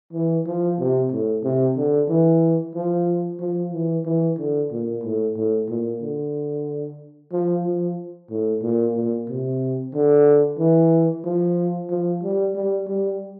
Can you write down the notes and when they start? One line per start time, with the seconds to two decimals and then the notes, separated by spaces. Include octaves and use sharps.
0.13 E3
0.46 F3
0.79 C3
1.12 A2
1.44 C3
1.77 D3
2.09 E3
2.75 F3
3.40 F3
3.73 E3
4.05 E3
4.38 D3
4.72 A#2
5.04 A2
5.37 A2
5.70 A#2
6.02 D3
7.32 F3
7.65 F3
8.31 A2
8.63 A#2
8.96 A#2
9.29 C3
9.94 D3
10.59 E3
11.25 F3
11.91 F3
12.23 G3
12.56 G3
12.88 G3